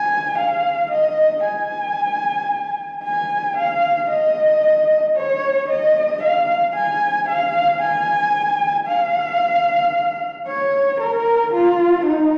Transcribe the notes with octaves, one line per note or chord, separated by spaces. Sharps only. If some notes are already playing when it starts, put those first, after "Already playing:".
Already playing: G#5
F5
D#5
G#5
G#5
F5
D#5
C#5
D#5
F5
G#5
F5
G#5
F5
C#5
A#4
F4
D#4